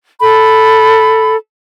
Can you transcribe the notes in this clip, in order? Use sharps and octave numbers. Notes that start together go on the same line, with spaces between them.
A4 B5